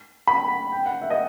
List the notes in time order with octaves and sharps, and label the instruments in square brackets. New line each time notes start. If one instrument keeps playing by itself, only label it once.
[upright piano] B5
G5
F#5
E5
D#5